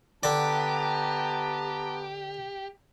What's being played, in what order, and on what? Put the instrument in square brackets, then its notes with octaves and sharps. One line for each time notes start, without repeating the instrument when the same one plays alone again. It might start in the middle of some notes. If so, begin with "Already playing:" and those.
[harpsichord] D3 D5 [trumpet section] B3 A5 A#5 [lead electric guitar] G4